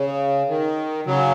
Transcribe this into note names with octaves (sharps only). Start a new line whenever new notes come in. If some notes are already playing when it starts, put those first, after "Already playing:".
Already playing: C#3
D#3
C#3 F#3